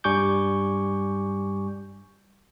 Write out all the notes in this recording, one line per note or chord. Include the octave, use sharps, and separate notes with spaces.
G2 G3 G#5 C#6 D6 G6